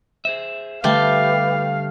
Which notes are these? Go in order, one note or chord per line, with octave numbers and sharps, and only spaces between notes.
G#4 C5 E5
D3 G3 A3 G4 B4 F5